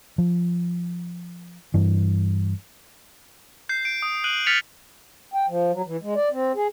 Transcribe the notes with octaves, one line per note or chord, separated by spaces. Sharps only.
F3
G2 E3
G6 C7
D7
D#6
F#6 D7 D#7 F#7
F6 A6 B6 C#7 F7
G5
F3
F#3
E3
G#3
D5
C4
G#4